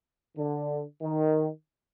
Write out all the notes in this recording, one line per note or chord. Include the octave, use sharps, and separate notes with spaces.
D3
D#3